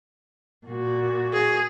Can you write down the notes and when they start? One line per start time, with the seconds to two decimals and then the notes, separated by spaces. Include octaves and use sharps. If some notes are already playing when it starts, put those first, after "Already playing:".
0.67 A#2 F#4
1.33 G#4